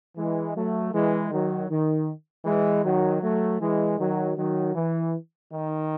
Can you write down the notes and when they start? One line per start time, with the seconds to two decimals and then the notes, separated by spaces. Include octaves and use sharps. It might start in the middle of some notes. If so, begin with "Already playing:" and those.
0.17 E3 G#3
0.55 F#3 A3
0.93 E3 G#3
1.31 D#3 F#3
1.69 D#3
2.45 E3 G#3
2.84 D#3 F#3
3.22 F#3 A3
3.60 E3 G#3
3.98 D#3 F#3
4.36 D#3 F#3
4.74 E3
5.51 D#3